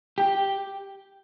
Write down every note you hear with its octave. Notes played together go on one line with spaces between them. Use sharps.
G4